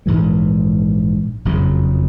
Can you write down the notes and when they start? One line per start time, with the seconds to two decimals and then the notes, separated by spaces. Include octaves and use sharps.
0.06 A#1 G#2 E3 G#3
1.45 F#1 F2 C#3 F#3